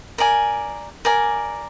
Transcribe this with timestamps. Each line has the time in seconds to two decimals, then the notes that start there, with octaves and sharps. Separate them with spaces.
0.18 A#4 D5 G#5
1.05 A#4 D5 G#5